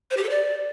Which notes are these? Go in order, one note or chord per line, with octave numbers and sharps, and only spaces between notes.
C5
G4
A4
D5